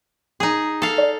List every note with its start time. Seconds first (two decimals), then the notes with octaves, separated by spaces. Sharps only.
0.40 D#4 G#4
0.82 A4 F5
0.98 D5